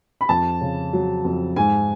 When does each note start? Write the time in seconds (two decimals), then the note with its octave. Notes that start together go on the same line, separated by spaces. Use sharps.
0.21 B5
0.29 F2 A5
0.61 C#3
0.93 F#3
1.25 F2
1.56 G#2 G#5